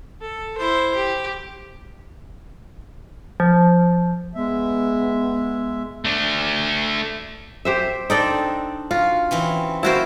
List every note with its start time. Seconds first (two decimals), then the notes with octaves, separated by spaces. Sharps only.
0.21 A4
0.58 E4 C5
0.95 G4
3.40 F3
4.35 G#3 B3 E5
6.05 A3 D4
7.65 G4 C5 E5
8.10 C4 D4 D#4 A4 D5 G5
8.91 F4 F#4
9.31 E3 C4 C#4
9.83 A#3 E4 F#4 A#4 C5 A5